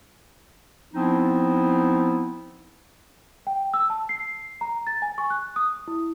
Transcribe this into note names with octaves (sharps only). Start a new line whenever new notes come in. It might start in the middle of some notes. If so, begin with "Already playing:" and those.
F3 B3 C4 D#4 E4
G5
E6
A5
C7
A#5
A6
G#5
C#6
F#6
D#6
E4